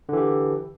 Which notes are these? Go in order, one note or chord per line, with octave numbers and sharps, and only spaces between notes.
D3 E3 G4